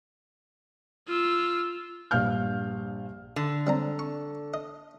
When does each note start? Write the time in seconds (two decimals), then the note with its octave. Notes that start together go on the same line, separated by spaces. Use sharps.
1.08 F4 E6
2.11 A#1 G2 F5 F6 G6
3.36 D3
3.67 G3 C4 A#5
3.99 C#6
4.54 D#5